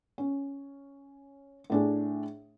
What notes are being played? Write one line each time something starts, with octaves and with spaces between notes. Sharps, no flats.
C#4
A2 D4 G#4